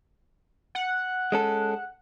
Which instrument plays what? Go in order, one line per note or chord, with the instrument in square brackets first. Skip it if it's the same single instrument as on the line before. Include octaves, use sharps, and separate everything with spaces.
[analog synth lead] F#5
[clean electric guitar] G#3 C#4 A4